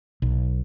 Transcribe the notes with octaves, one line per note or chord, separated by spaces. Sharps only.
B1